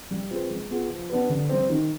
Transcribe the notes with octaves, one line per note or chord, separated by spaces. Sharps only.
G3
C4 F4 G#4 B4
G#3
B3 F4 G#4
F3
B3 D4 G4 B4
D3
G3 C4
D#3